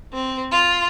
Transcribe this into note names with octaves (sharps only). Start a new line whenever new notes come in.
C4
F4